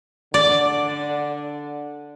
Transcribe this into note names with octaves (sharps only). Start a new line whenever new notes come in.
D3 D5